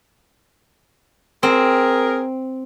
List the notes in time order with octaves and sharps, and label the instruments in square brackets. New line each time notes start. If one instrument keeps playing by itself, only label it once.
[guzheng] C4 [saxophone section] G#4 A#4